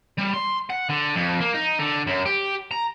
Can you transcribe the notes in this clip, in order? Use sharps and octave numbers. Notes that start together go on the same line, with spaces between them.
G3
C6
F#5
D3
F2
A#3
D#4
D3
F#2
G4
A#5